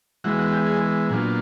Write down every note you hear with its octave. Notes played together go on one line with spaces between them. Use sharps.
E3 G#3 B3 F#4
F#4
G4
G#4
A#2 F#3 B3 D4 F4 G#4